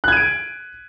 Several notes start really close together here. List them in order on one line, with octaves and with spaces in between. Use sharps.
F#6 G#6 D#7 D7